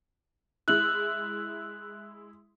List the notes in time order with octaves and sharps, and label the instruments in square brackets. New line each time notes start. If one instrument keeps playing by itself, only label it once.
[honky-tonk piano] G#3 E4 [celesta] F#6 F#7